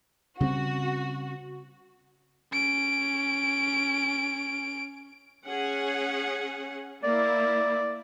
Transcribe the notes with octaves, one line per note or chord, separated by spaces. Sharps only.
C#3 G3 C4 F#4
C#4 D7
C#4 G#4 F#5
A#3 E4 D5